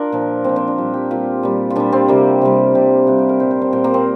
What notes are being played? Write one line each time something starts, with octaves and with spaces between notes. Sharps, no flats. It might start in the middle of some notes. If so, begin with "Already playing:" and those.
Already playing: D4 F4 A#4
A#2 F3
A#2 F3 C4
C4
D4
A#2 G3 F4
G4
A#2 G3 F4
A#2 G3
F4
A#2 G3 D4
C4
C3 G3 A#3
C3 G3
C3 G3
C3 G3 D4
G4
A#4
A#2 G3 C5
C5
C4
A#2 G3 C4
A#3
C4